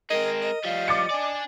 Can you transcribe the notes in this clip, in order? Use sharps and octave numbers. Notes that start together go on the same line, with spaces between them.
G#3 C4 A#4 D#5
D#5
F3 G3 F5
D6 A6 C#7
D4 D5 G#5